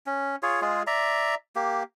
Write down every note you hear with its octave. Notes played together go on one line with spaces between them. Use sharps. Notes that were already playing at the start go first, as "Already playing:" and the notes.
C#4
F4 G#4 C#5
G#3 F4 G#4
D5 E5 A#5
A#3 G4